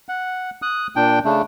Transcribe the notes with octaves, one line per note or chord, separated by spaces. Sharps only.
F#5
D#6 F#6
A#2 D4 G5
C#3 A3 D4